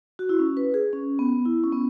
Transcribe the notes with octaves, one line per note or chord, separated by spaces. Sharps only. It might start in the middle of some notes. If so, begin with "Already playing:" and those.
F#4
E4
C#4
B4
G#4
C#4
B3
E4
C#4
B3